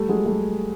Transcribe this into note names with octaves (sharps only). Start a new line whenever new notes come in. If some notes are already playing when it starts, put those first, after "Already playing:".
Already playing: G3 A3
F#3 G#3
G3 A3